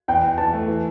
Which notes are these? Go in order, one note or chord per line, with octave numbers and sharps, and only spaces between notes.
E2 G5
E2
E3 A5
A3
E3